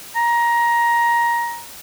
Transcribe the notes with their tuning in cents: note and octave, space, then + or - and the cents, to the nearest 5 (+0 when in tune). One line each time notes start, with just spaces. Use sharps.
A#5 +15